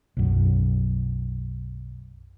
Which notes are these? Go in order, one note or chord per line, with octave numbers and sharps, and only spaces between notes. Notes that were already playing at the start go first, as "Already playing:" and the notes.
B1 F#2